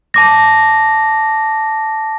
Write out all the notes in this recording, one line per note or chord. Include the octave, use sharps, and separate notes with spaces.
A5 D6 A#6